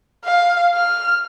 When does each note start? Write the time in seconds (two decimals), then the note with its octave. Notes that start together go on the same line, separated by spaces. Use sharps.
0.25 F5
0.75 F6